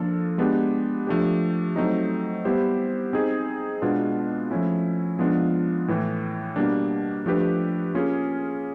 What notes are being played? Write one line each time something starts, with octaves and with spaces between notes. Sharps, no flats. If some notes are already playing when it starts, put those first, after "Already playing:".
Already playing: F3 A#3 D4 F4 A4
G#3 B3 D4 G4
F3 A3 D4 G4
F#3 A3 C4 D#4
G3 B3 E4 G4 C5
C4 D#4 G#4
B2 G#3 B3 D4 F4
F3 A3 C#4 E4
F3 G#3 B3 D4 F4
A2 E3 A3
B2 G3 A#3 D4
F3 A3 D4 G4 B4
A#3 C#4 F4 G#4